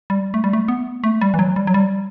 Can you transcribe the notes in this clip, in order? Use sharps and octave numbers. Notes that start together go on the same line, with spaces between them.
G3
A3
G3
A3
B3
A3
G3
E3
F#3
G3
F#3
G3